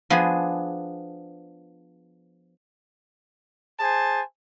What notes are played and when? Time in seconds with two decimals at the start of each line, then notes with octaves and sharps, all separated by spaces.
0.10 F3 B3 D4 G#4
3.80 G#4 C5 G#5 A5